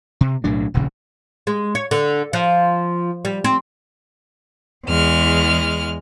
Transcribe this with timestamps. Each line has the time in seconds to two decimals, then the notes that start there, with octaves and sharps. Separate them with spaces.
0.21 C3
0.44 B1 A2 F#3 D4
0.74 D#1 A#1 A2 C#3
1.47 G#3
1.75 C#5
1.91 D3
2.33 F3
3.25 G3
3.44 C4
4.86 E2 G#3 F6